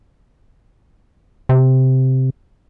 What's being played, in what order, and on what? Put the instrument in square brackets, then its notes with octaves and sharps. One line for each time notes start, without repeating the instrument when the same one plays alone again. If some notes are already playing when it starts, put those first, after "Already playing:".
[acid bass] C3